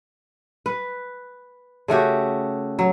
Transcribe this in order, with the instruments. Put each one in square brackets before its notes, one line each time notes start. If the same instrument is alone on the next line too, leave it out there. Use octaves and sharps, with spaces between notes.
[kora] B4
C#3 A3 F#4 G4
F#3